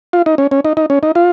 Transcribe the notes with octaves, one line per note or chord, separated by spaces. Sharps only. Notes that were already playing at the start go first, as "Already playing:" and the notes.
F4
D#4
C#4
C#4
D#4
D#4
C#4
D#4
F4